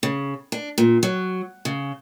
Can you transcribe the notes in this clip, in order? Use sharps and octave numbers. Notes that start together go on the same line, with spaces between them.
C#3
D4
A#2
F#3
C#3